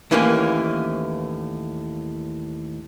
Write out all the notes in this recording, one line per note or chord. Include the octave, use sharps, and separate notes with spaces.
D#2 A2 E3 A#3 C4 C#4